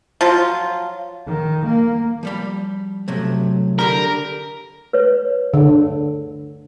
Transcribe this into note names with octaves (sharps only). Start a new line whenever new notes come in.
F3 F#3 F4
D#3
A#3
F3 G3 B5
C3 F#3 A3
D3 G4 A#4 B5
B4 C#5
D3